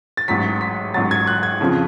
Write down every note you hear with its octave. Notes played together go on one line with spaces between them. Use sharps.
A6
A1 G#2 F#3 B6
B6
A1 G#2 F#3 A6
G#6
F#6
G#6
F2 C#3 F3